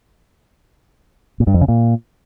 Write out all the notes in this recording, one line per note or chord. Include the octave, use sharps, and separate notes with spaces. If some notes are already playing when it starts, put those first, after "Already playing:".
A#2
G2
F2
C#3
A#2